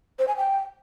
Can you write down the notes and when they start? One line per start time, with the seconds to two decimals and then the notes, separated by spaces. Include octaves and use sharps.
0.19 C5
0.28 G#5
0.37 G5